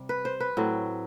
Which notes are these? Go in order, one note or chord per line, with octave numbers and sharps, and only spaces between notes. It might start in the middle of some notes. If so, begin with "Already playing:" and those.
Already playing: C3 G3
B4
C5
B4
A2 F#3 C4